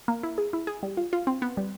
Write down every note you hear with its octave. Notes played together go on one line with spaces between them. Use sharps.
A#3
E4
G#4
E4
G#4
G3
F4
F4
C4
B3
G3